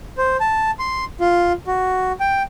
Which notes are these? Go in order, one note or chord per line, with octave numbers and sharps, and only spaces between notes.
C5
A5
C6
F4
F#4
G5